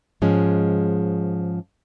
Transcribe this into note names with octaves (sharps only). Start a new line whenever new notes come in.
G#2 F3 G#3 C#4